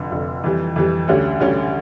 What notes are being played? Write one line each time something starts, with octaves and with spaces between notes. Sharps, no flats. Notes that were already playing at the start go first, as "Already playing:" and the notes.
Already playing: F1 F2 D3
F1 F2 D3
F2 E3 G3
F2 E3 G3
D2 D3 G3 C#4 G4
D2 D3 G3 C#4 G4